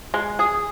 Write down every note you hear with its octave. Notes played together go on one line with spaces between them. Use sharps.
G#3
G#4